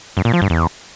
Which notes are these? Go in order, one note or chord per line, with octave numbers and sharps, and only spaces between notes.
F#2
A#2
F3
G2
E2